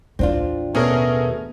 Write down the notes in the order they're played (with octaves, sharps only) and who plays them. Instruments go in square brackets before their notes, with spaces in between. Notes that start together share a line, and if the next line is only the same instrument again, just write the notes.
[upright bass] A1 D#2 [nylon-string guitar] C4 D4 F4
[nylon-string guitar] B2 [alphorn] A3 [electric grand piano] C#4 G#4 A#4